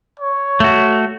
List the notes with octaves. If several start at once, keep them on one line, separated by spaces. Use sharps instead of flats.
C#5
A3 F#4